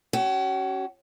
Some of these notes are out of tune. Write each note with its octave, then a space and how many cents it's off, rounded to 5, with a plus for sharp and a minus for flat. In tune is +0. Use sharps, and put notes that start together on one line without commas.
C#4 +0 F#4 +40